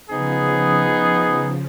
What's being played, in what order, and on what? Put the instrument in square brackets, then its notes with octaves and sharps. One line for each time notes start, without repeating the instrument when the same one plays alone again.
[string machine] C#3 F3 [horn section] B3 D#4 G#4